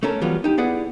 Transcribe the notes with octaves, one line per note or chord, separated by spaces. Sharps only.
A3 C#4 A4 A#4
E3 F#3 G3 B3 F4 F#4
D#4 G4
B3 E4 G#4 B4 D5 F#5